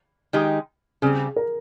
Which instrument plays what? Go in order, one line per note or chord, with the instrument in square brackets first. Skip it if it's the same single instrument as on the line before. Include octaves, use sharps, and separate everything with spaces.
[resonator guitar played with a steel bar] D#3 G#3 D#4 G4
[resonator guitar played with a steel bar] C#3 G3 C4 [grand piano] G#4
[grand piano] A#4